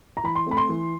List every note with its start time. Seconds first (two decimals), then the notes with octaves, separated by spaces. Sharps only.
0.17 A#5
0.24 E3 B5
0.35 C6
0.46 A3 C4 B5
0.57 C6
0.69 E3